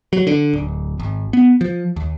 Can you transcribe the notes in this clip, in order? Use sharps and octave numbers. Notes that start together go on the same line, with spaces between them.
F#3
D3
D1
G#1
B3
F3
D#2